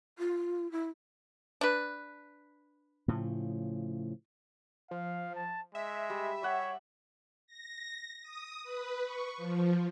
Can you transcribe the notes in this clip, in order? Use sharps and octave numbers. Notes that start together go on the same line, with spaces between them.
F4
E4
D4 B4
A2 C#3 F3
F3 F5
A5
G#3 E5
G3
G3 C#5 F#5
A#6
D#6
B4
C#6
F3